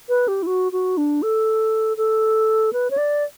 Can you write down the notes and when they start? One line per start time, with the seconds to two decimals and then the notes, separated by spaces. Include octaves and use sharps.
0.09 B4
0.28 G4
0.42 E4
0.47 F#4
0.72 F#4
0.97 D4
1.22 A4
1.97 A4
2.73 B4
2.90 C#5
2.97 D5